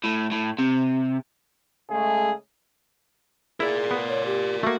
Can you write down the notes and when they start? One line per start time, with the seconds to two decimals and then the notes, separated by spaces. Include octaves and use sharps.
0.04 A2
0.32 A2
0.59 C3
1.90 C#3 G#3 A3 G#4
3.60 E4 G#4 A#4 D5
3.91 B3
4.09 C#5
4.26 G4
4.63 A3 A#3 F#4